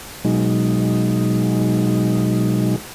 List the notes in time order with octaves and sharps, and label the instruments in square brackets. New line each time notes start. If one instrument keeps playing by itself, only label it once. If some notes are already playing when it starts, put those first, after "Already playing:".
[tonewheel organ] B2 F#3 G#3 D#4